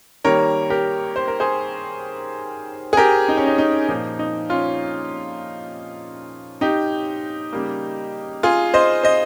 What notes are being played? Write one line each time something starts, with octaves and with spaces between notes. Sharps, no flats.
D#3 G3 A#3 A#4 C#5
G4 A#4
C5
A#4
G#4 C5
G#4
G4 A#4
D#4
C#4
D#4
D#4
A#2 F3 A#3 D#4
D#4
C#4 F4
D#4 G4
C#3 G3 A#3
F4 G#4
C5 D#5
C5 D#5